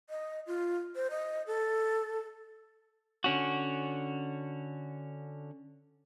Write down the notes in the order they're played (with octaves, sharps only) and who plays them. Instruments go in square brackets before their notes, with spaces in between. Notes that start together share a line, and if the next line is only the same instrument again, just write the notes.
[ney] D#5
F4
C5
D#5
A4
[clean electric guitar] D3 C#4 F#4